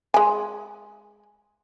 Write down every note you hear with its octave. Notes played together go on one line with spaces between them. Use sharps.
G#3 G#5